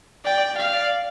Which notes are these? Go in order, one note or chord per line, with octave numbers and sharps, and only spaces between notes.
D5 G5
F5
D5